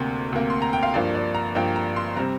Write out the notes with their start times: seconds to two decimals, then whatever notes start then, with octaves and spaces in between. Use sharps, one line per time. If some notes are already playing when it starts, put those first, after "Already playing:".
Already playing: D2 C3 A#3 G5
0.33 D2 C3 A#3
0.50 C6
0.62 A#5
0.73 G5
0.83 F5
0.94 G2 F3 A#3 D5
1.15 D5
1.35 A#5
1.55 G2 F3 A#3 G5
1.76 A#5
1.96 C6
2.16 C3 G3 C4 A#5